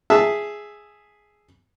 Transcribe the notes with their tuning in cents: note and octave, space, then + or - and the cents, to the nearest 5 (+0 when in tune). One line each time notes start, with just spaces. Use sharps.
G#4 +0 E5 +0 A5 +0